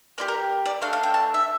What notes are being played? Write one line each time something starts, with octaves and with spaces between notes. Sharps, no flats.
A#3 E4 G4 D5
A#4
D5
A3 D4 A4 F5
F5
G5
A5
E5